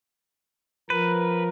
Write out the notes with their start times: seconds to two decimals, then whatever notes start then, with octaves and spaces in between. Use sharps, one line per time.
0.90 F3 A#4 B4